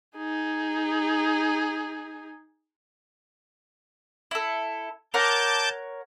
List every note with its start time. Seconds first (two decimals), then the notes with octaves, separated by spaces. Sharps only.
0.17 D#4 G#4
4.31 E4 A4
5.14 A#4 C#5 F#5 A5 D6 G6